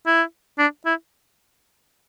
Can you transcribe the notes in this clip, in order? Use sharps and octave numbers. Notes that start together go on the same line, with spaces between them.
E4
D4
E4